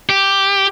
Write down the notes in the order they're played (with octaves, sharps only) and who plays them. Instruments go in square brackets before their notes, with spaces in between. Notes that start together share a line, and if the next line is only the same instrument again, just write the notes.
[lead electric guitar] G4